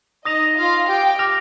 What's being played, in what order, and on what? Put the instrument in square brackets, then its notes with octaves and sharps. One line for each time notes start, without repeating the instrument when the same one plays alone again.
[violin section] D#4 D#5 [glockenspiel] D#6 A#6 F7
[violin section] F4 F5
G4 G5
[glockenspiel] D6 F6 A#6 F7